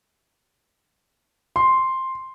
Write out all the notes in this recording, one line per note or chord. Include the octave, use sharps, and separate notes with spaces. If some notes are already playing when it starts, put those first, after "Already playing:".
C6